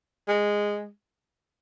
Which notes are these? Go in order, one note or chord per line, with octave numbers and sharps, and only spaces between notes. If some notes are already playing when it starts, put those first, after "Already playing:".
G#3